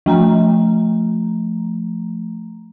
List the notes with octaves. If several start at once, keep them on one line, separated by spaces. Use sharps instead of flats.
F3 A3 A#5